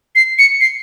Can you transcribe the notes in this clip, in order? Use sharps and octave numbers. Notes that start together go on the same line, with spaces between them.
C7
C#7
C7